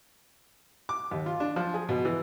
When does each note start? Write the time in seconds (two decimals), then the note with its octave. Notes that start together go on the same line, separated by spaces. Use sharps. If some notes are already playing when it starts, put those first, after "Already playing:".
0.89 D6
1.11 D#2
1.26 F4
1.40 D4
1.56 F3
1.74 G#4
1.89 B2
2.05 E3